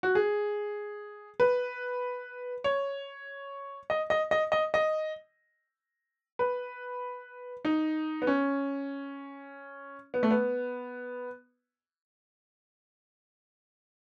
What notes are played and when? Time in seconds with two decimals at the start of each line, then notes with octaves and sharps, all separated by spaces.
0.03 F#4
0.15 G#4
1.40 B4
2.64 C#5
3.90 D#5
4.10 D#5
4.31 D#5
4.52 D#5
4.74 D#5
6.39 B4
7.65 D#4
8.22 B3
8.27 C#4
10.14 B3
10.23 A3
10.31 B3